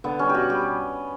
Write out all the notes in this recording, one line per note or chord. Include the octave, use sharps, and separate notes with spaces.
D3 B3
G3 C#4
G4
B2 F#4
G3 G4